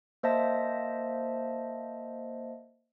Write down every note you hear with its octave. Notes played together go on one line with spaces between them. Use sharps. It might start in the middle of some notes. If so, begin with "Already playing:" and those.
A#3 C5 D#5 E5 A5 A#6